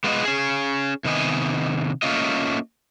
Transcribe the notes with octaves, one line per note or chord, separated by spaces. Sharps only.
G#3 B3 F4 B4 C#5 D#5
C#4 G#4
C3 D#3 B3 D#5 G#5
A3 A#3 C#4 F4 D#5